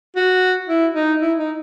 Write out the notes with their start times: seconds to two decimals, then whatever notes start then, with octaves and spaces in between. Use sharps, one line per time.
0.16 F#4
0.68 E4
0.94 D#4
1.21 E4
1.39 D#4